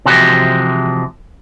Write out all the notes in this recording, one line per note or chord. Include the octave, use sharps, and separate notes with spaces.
C3 E3 F3 G#3 F#4 G4